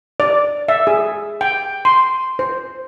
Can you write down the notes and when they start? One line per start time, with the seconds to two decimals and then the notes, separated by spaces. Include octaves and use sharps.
0.20 D5
0.68 E5
0.87 G#4
1.41 G5
1.85 C6
2.39 C5